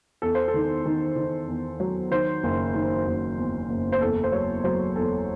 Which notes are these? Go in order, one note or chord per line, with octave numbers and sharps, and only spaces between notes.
E2 A4
C5
A4
D#3
D#3
D#3
E2
F#3
D#3 C5
F#1
D#3
F#1
E2
F#1
C5
E2 A4
C5
F#3 C#5
F#3 C5
E2 A4